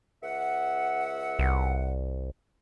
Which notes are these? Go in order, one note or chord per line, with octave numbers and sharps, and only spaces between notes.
C#2 E5 F#5
C2